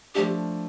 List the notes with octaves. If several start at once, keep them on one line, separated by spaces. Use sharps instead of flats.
F3 A3 D4 G4